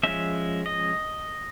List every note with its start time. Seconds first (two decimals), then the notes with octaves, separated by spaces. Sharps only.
0.03 F3 G#3 C#4 E5
0.66 D#5